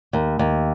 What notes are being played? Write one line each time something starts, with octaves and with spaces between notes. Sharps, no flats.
D#2
D#2